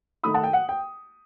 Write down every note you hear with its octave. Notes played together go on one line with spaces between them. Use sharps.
D#3 A3 D#4 B5 D#6
F#5 A5
G5
F#5
G5